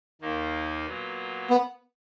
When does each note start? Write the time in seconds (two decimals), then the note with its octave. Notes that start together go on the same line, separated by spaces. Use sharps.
0.21 D#2 D#3 A#3 D#4
0.85 A#2 F#3 B3
1.50 B3